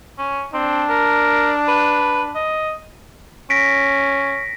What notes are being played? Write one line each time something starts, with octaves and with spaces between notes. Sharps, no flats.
C#4
C4 D4
A#4
B4
D#5
C#4 A#6 B6 D7